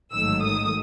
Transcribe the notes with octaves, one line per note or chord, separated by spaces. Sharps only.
A1 G#2 D#3 F#3 A3 E6
D#6